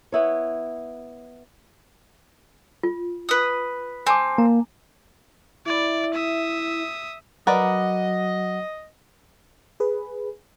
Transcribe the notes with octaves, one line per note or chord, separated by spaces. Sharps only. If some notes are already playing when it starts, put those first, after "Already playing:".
B3 E4 C#5
F4
B4 D#6
C4 G#5 A5 D6
A#3 A#5
E4 D5
E5 D#6
F#3 A#4 B4 D5 D#5 F#5
G#4 B4